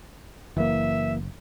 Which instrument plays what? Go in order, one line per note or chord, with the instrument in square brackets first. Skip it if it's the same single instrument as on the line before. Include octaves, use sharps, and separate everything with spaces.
[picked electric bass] F#1 [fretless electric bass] E3 A#3 [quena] E5